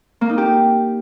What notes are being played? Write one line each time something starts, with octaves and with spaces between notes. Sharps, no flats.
A#3
D#4
G4